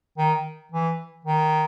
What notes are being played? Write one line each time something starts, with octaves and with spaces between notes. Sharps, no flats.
D#3
E3
D#3